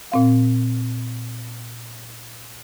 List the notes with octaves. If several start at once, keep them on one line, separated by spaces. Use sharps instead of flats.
A#2 C4 F5